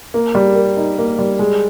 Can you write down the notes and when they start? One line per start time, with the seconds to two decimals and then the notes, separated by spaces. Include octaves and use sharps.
0.14 A#3
0.35 G3
0.55 A#4
0.77 D#4
0.98 A#3
1.19 G3
1.39 G#3